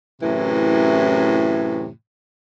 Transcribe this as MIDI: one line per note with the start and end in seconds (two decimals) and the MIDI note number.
0.21 1.88 42
0.21 1.88 45
0.21 1.88 48
0.21 1.88 52